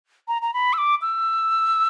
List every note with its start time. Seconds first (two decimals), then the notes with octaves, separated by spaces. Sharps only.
0.28 A#5
0.42 A#5
0.54 B5
0.73 E6
0.78 D6
1.02 E6